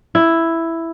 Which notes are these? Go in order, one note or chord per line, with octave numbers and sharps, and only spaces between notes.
E4